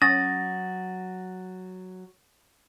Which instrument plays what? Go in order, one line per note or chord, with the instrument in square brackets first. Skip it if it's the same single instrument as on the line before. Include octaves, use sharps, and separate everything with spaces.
[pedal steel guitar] F#3 F#4 D#6 [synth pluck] C#4 [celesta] A6 [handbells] A#6